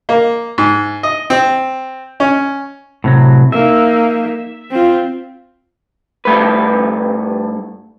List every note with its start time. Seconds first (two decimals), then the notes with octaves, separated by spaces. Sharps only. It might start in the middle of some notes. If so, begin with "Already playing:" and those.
0.09 A#3
0.58 G#2
1.03 D#5
1.30 C4
2.20 C#4
3.04 A2 C3 F#3
3.52 A#3 D#4 E5
4.71 C4 F4
6.25 G2 A3 B4